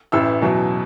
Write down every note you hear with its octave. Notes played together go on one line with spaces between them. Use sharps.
A1 A2 E3 E5 E6
E2 B2 F#3